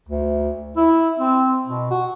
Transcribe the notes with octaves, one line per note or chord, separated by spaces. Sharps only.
D2
E4
C4
B2
F#4